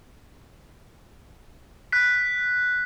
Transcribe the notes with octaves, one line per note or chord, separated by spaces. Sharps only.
F#6 B6